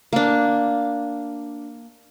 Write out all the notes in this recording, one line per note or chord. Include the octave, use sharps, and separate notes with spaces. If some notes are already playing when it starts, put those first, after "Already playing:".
A#3 D4